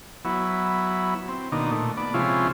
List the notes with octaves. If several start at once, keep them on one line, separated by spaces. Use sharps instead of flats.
F#3 B3 E4
C4
B2 D#3 A#3 D4 D#4
A#2 A3
B3 D5
C3 F3 G#3 C#4 E4 F4